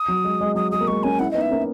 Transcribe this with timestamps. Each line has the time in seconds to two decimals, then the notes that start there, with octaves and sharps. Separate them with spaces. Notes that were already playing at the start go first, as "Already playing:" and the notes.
Already playing: D#6
0.08 F#3
0.24 G#3
0.41 G#3
0.56 F#3 D#6
0.71 G#3 D#6
0.81 A#3
0.87 G#3 C#6
1.03 A#3 C#4 G#5
1.19 C#4 E4 F#5
1.31 B3 D#4 D#5
1.41 E5
1.51 A#3 C#4